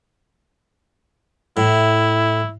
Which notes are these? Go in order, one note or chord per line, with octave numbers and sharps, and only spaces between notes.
A2 E4